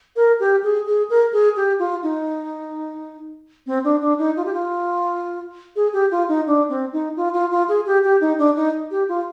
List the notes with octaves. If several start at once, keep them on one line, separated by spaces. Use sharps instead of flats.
A#4
G4
G#4
G#4
A#4
G#4
G4
F4
D#4
C4
D4
D4
D#4
F4
G4
F4
G#4
G4
F4
D#4
D4
C4
D#4
F4
F4
F4
G#4
G4
G4
D#4
D4
D#4
G4
F4